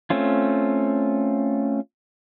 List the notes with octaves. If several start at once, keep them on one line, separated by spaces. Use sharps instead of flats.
A3 C4 C#4 F4